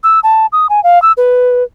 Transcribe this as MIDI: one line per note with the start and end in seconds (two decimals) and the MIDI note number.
0.04 0.20 88
0.23 0.46 81
0.52 0.67 87
0.69 0.83 80
0.84 1.01 77
1.02 1.12 88
1.17 1.63 71